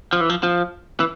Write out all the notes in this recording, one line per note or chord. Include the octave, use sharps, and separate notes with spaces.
F3
E3
F3
F3
E3